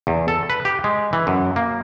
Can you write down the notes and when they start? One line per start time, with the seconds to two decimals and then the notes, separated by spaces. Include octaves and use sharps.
0.07 E2
0.28 A4
0.50 B4
0.65 G4
0.84 G#3
1.13 E3
1.27 F#2
1.56 A#3